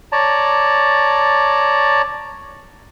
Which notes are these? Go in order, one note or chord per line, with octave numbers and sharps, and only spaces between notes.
C#5 D5 A5 A#5